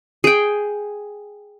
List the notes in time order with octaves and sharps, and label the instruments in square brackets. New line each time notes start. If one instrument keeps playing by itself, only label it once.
[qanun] G#4 G5